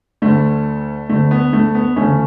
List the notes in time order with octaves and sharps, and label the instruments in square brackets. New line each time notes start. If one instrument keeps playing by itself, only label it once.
[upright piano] D2 D3 A3
D2 D3 A3
B3
A3
B3
D2 C#3 E3 A3 C#4